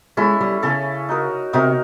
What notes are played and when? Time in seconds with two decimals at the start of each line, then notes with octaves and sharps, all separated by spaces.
0.17 G#3 C#4 E4 A4
0.41 G3
0.63 C#3 C#4 E4 A4
1.09 D#4 F#4 A#4
1.53 C3 D#4 F#4 A#4